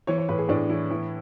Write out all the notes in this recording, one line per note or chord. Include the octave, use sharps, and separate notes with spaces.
E3 C#5
C#5
A2 B4
G#4
A2 D4
E3 E4
E3 E4